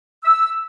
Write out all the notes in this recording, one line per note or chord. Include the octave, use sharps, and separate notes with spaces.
E6